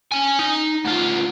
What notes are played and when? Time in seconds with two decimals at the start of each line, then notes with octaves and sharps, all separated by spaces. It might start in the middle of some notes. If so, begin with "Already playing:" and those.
0.12 C#4 G#5
0.39 D#4
0.85 D2 F4